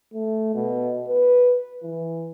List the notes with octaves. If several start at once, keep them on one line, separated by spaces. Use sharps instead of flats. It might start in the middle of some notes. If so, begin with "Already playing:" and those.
A3
B2
B4
E3